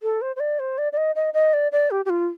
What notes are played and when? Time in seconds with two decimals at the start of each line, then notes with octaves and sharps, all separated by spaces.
0.03 A4
0.22 C5
0.36 C5
0.40 D5
0.59 C5
0.78 D5
0.92 D5
0.97 D#5
1.15 D#5
1.34 D#5
1.53 D5
1.72 D5
1.91 G4
2.05 G4
2.10 F4